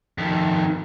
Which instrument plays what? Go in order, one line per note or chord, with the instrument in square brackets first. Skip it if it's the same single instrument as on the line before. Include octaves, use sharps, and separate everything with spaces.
[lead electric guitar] F2 D#3